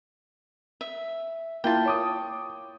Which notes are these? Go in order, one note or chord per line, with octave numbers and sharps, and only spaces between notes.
E5
A#3 E4 F4 G5 A5
C#5 D6 D#6